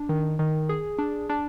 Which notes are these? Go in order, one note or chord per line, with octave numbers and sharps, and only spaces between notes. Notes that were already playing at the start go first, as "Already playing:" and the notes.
Already playing: D4
D#3
D#3
G#4
D4
D4